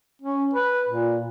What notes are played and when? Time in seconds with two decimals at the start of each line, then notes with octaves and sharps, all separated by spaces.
0.21 C#4
0.53 B4
0.89 A#2